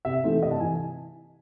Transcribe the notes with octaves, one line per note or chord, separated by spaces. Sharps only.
C3 E5
E3 A3 C4 D#4
C3 D#5
A5
E3 G#5